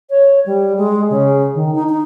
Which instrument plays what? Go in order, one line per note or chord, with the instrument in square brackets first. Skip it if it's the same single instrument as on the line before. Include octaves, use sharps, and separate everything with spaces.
[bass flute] C#5
G3
G#3
C#3
D#3
D#4
D#4